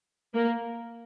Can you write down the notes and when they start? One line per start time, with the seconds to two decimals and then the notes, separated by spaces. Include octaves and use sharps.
0.34 A#3